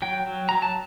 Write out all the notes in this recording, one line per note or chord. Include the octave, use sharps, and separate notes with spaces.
F#3 G5
F#3
F#3 A#5
A5